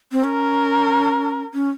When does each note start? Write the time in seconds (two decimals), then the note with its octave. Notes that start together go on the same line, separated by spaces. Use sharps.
0.12 C4
0.24 C#4 A#4
1.54 C#4